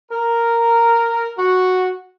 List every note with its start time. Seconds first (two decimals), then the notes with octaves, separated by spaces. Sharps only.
0.11 A#4
1.37 F#4